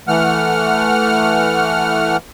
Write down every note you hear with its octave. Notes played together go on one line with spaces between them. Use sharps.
E3 A3 F#5 F6